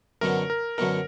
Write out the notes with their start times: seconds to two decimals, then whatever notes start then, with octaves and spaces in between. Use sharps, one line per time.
0.21 F#2 D3 F#3 B3 D#4 A#4
0.50 A#4
0.78 F#2 D3 F#3 B3 D#4 A#4